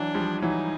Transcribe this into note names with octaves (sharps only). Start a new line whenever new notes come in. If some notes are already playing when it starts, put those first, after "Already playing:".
Already playing: E3 F#3 D4
F3 G3
E3 F#3 D#4